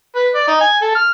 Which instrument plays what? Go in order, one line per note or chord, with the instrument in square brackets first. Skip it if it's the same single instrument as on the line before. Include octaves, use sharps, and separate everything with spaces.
[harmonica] B4
D5
D#4
G#5
A4
F6